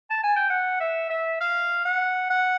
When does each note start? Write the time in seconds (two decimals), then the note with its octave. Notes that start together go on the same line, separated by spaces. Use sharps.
0.10 A5
0.23 G#5
0.36 G5
0.50 F#5
0.80 E5
1.10 E5
1.40 F5
1.85 F#5
2.30 F#5